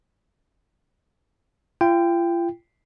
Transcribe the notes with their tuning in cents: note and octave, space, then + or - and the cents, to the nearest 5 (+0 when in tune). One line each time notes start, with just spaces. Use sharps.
F4 -40 G5 +5